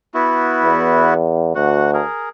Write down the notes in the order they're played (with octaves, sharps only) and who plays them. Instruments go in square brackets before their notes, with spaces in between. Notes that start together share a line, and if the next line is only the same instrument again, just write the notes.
[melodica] B3 E4 F#4
[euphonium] E2
[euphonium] D2 [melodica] F#4 F#5
[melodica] G#4 A#4